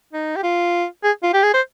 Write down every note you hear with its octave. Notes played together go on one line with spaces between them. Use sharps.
D#4
G4
F4
G#4
F4
G4
G#4
C5